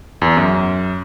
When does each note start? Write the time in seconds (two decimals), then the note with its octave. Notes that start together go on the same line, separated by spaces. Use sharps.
0.22 E2
0.37 F#2